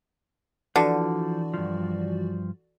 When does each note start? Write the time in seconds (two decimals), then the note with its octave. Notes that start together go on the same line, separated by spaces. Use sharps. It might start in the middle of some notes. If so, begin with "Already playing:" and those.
0.76 D3 E3 F3 F#4 D5
1.54 G2 F3